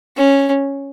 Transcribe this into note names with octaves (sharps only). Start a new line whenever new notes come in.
C#4